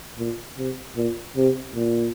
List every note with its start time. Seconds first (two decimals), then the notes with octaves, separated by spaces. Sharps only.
0.18 A#2
0.58 C3
0.97 A#2
1.37 C3
1.75 A#2